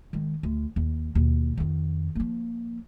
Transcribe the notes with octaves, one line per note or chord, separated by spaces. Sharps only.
D#3 G#3
D2
D#2
D#2 B2
F2 D#3
F3 A#3